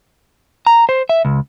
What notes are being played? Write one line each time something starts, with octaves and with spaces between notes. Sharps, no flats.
A#5
C5
E5
C#2